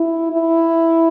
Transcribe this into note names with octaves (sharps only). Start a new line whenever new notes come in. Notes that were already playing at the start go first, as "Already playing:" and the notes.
Already playing: E4
E4